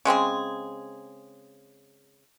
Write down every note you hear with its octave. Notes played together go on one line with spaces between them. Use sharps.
C#3 G#3 C4 G#4